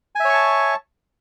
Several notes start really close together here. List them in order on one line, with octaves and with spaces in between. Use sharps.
G#5 E5 C#5 C#6 A5